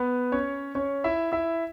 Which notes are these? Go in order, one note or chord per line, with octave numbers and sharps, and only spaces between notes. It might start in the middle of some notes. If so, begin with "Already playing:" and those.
Already playing: B3 B4
C#4 C#5
C#4 C#5
E4 E5
E4 E5